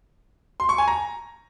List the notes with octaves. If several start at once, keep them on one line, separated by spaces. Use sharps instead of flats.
C6
C#6
G#5
A#5